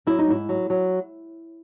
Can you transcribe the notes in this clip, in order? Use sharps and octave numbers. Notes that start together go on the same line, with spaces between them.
F#3 E4
D#4
G#2 E4
F#3
F#3